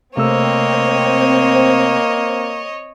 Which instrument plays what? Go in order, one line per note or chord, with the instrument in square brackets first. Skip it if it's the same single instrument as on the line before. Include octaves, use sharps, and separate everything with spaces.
[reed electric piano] C3 A3 E6 [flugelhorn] A#3 [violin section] C4 [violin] C#5 D#5